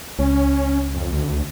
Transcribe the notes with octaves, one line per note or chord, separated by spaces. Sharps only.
C#2 C#4
F2
D2